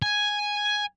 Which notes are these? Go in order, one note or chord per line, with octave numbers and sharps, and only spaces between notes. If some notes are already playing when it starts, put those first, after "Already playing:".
G#5